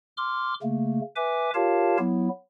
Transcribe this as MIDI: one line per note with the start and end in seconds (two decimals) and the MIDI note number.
0.17 0.54 84
0.17 0.54 86
0.17 0.54 89
0.63 1.00 49
0.63 1.00 57
0.63 1.00 58
1.16 1.50 71
1.16 1.50 76
1.16 1.50 80
1.16 1.50 86
1.54 1.97 65
1.54 1.97 67
1.54 1.97 70
1.54 1.97 73
1.54 1.97 77
1.54 1.97 81
1.99 2.29 54
1.99 2.29 59
1.99 2.29 64